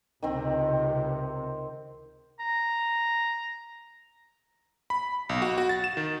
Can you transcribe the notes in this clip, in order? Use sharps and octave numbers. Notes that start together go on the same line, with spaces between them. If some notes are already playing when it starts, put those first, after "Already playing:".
C#2 C3 D#3 C4
A#5
B5
B1
F#4
F#4
A6
E7
D#3